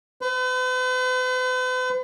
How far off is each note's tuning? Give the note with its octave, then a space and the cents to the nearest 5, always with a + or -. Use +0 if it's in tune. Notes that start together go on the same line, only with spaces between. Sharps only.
B4 +45